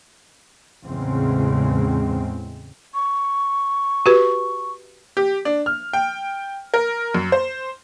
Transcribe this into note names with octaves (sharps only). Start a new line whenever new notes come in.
E2 A2 C#3 G#3 C4
C#6
F#4 G4 B4
G4
D4
F6
G5
A#4
F#2
C5